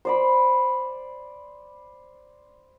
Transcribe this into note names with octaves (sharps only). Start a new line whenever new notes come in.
C5 D5 B5